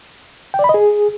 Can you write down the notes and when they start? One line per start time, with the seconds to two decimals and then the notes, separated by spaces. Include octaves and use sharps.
0.54 G5
0.59 D5
0.64 B5
0.69 D#5
0.74 G#4